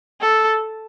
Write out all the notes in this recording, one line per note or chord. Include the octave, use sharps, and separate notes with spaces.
A4